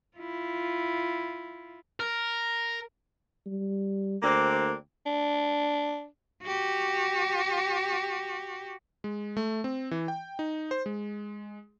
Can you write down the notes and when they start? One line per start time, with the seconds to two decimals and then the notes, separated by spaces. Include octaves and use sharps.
0.17 E4 F4
2.00 A#4
3.46 G3
4.22 D2 A#3 C4 D4
5.06 D4
6.44 F#4 G4
9.04 G#3
9.37 A3
9.64 C4
9.91 E3
10.08 G5
10.39 D#4
10.71 C5
10.86 G#3